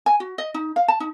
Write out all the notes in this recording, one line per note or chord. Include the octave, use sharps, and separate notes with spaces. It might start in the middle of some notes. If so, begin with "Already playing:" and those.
G#5
F#4
D#5
D#4
F5
A5
D#4